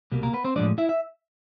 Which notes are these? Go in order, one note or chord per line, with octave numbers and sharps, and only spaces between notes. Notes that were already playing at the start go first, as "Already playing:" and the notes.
C2 B2 G3 A#3
A#3 A#4
B3 B4
C4 C5
A2 F3 G#3 D4 D5
E4 E5
E5